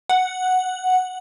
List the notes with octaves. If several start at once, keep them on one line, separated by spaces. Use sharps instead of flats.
F#5